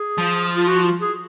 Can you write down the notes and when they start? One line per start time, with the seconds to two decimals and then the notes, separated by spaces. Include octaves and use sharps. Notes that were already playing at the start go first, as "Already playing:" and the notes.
Already playing: G#4
0.18 F3
0.56 F4
0.67 F#4
0.83 F4
1.00 G#4